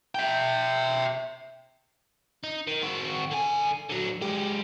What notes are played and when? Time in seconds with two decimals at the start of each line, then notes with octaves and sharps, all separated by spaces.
0.15 E5 G5
2.44 D#4
2.68 D#3
2.82 C4 F#4
3.31 D3 G#5
3.90 D3 F#3
4.22 G#3 G4